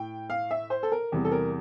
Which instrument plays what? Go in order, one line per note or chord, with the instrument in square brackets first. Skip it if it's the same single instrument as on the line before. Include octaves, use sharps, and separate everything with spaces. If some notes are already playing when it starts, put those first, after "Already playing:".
Already playing: [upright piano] A2 G5
F5
E5
C5
A4
A#4
E2 C3 G3
A4
A#4